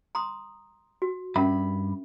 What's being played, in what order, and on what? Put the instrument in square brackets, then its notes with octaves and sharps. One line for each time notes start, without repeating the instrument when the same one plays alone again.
[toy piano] A#5 C6 D#6
F#4
[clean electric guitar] G2 B5 [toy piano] C#4 A#4 E5